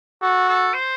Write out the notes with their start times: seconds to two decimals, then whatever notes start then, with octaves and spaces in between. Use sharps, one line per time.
0.22 F#4 A4
0.49 A4
0.74 C5